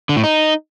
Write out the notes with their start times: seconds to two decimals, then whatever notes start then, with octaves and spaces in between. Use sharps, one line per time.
0.09 D3
0.16 A2
0.24 D#4